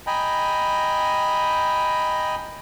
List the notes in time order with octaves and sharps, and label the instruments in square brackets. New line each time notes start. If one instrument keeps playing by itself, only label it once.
[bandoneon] D#5 G5 G#5 A#5 B5